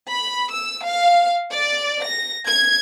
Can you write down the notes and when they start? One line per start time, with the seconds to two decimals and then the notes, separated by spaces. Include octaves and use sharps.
0.12 B5
0.51 E6
0.85 F5
1.53 D5
2.05 A#6
2.49 G#6